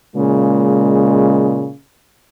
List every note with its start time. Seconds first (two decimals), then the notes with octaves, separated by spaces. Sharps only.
0.15 A#2 C#3 G#3